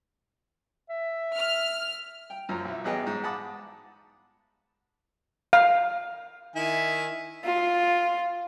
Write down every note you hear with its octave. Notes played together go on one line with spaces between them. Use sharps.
E5
F6
G5
F#2 F3 F#3
B1 E4
A1 F#3 B3 G#4 D#5 G5
G#2
F#5 A5 B5 D6 D#6
F5
D#3 E4 G#5
F4